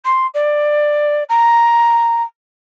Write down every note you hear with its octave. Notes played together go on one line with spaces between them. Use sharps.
C6
D5
A#5